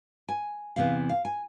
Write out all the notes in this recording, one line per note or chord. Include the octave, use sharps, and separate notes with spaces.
G#5
E2 C3 E3 B3 F5
F5
G#5